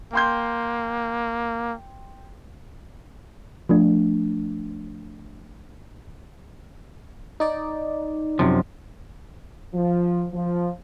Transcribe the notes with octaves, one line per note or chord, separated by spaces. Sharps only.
A#3 G5 C6 G6
F3 A3 D4
D#4 D5
F#2 C3 F3
F3
F3